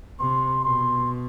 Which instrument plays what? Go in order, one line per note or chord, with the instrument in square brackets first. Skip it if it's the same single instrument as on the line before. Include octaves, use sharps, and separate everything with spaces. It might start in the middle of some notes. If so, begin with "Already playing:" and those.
[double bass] C3 [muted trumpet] C6
[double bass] B2 [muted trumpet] C6